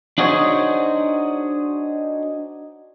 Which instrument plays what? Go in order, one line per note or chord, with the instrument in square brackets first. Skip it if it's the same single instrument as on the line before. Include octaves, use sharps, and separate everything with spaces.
[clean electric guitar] D4 D#4 F#4 G#4 C5 C#5